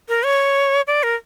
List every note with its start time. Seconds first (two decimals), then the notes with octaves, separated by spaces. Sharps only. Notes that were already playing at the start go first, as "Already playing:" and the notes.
0.09 A#4
0.25 C#5
0.87 D5
1.03 A#4